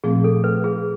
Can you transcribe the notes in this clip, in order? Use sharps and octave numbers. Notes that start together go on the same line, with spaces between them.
A#2 F3 A3 C4 G#4
A4
B4
G#4